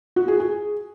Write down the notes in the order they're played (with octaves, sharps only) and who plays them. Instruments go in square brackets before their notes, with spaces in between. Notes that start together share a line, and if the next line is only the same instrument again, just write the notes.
[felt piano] F#4
G#4
G#4